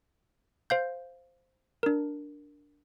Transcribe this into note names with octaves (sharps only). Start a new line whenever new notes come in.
C5 F5 G6
D4 A#4